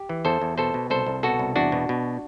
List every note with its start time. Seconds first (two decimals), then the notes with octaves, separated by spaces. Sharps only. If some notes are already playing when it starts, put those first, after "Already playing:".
Already playing: G4
0.09 E3
0.25 E2 A4 C5
0.42 E2
0.58 B2 A4 C5
0.74 B2
0.90 C2 A4 C5
1.07 C2
1.23 B2 F#4 A4
1.39 C2
1.56 E2 D4 F#4
1.72 B2
1.89 B2